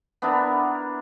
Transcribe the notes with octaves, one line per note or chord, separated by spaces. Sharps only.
B3 D4 E4 A#4